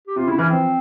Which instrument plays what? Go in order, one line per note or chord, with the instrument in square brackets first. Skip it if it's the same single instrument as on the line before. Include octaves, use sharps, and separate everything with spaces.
[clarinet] G4
[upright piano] C3 [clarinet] F4
[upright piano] C#3 [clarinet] E4
[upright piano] E3 [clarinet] C#4
[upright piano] F3 [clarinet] C4